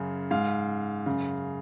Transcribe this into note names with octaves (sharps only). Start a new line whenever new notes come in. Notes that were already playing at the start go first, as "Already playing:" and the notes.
Already playing: F#2 C#3
G#2 F5
F#2 C#3